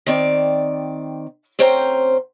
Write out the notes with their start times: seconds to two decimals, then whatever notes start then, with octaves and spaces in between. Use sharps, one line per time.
0.06 D#3 C4 D5
1.59 D2 C4 C#4 C5 G5 A#5